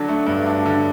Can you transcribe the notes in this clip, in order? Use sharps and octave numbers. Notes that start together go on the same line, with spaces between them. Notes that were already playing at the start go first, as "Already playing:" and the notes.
Already playing: D3 F#3 D4
A3
G2
D4
D3